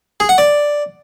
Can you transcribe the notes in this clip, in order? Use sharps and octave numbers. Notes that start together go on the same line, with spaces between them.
G#4
F#5
D5